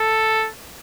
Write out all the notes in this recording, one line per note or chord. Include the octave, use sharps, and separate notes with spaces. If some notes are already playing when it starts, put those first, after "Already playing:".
Already playing: A4